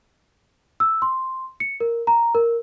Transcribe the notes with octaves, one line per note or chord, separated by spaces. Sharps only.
E6
C6
C#7
A#4
A#5
A#4